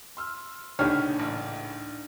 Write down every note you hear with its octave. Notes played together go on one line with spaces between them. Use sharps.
C6 E6 F6
C#2 A#2 D3 D4 D#4 G4 C#5 F6
A1